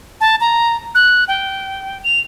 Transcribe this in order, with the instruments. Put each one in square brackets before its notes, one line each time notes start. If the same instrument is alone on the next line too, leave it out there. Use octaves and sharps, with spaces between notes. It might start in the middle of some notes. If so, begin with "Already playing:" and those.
[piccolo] A5
A#5
F#6
G5
F7